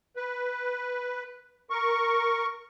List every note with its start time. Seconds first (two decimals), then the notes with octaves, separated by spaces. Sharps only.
0.16 B4
1.70 A#4 C#6